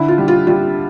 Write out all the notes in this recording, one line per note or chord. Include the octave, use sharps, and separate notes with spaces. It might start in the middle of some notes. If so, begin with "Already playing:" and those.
Already playing: D3 E4
F4
G3
F4
G3 F4